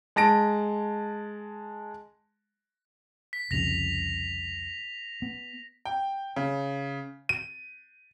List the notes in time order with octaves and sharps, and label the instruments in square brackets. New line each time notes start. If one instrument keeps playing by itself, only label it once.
[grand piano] G#3 A5 A#6 D7
[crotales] B6
[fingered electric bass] C2 F2 C#3 [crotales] A#6 F7
[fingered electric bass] B3
[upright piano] G5
C#3
D#7